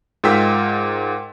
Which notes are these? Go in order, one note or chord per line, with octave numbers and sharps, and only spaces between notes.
G#2 F4 A#4 G5 E6 B6